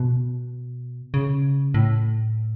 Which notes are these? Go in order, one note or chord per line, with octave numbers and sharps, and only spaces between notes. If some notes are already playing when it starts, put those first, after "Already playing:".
Already playing: B2
C#3
A2